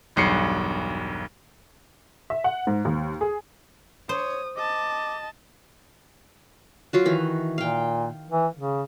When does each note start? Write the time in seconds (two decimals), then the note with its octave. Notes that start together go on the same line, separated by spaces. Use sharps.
0.16 E1 B1 G2 C7 C#7
2.30 E5
2.44 F#5
2.67 G#2
2.85 D#2
3.21 G#4
4.09 C5 C#5 D#6
4.56 D#5 A5 D6
6.93 F#3 F4 F#4
7.05 D#3 E3
7.58 A#2 F5 G5
8.31 E3
8.58 C#3